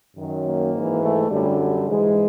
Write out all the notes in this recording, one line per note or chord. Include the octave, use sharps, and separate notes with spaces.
F#2 D#3 F#3
A#3
G#2 E3
A3
F#2 D3 F#3 G3
G3
G#2 E3 G#3